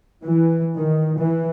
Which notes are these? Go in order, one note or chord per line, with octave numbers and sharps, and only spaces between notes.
E3
D#3
E3